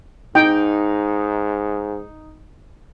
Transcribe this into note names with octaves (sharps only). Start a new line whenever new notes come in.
G#2 D#4 G5